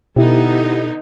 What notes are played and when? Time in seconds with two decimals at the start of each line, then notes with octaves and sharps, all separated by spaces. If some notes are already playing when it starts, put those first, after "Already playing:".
0.16 B2 D3 B3 D#4 E4 G4